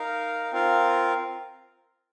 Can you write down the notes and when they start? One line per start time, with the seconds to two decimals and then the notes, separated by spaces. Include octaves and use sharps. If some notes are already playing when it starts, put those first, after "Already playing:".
Already playing: D#4 A#4 F5
0.52 C4 F4 A#4 F5